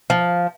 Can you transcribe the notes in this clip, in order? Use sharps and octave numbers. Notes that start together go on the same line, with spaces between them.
F3